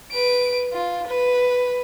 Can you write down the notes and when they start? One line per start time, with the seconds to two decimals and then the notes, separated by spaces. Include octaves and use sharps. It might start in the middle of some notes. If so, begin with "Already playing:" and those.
0.11 B4 D7
0.73 F4
1.07 B4